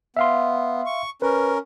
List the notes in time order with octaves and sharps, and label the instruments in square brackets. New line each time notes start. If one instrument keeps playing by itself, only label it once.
[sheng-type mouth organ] B3 [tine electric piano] E5 F5 C6
[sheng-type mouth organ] C#6
[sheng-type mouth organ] C#4 A#4 [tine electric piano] B4